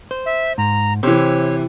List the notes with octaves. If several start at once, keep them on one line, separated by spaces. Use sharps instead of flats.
C5
E5
G#2 A#5
C3 E3 C5 C#5